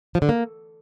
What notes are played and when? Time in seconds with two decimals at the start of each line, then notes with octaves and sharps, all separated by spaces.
0.15 F3
0.22 D3
0.29 A#3